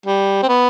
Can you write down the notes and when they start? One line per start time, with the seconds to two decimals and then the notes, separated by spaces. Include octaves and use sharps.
0.06 G3
0.43 C4
0.49 B3